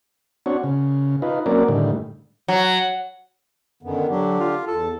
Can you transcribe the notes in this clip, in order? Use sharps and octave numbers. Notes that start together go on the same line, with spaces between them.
C4 D4 F#4 C#5
C#3
D#4 F4 B4
F#3 A#3 C4 C#4 A#4 D5
A2 D3 D#3 G3
F#3
F#2 D3 D#3 B3
D3 F#3 D4 G4
F4
E2 A4 A5